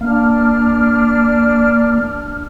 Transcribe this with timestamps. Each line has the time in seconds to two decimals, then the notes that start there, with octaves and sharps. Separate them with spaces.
0.01 A#3 D4 F6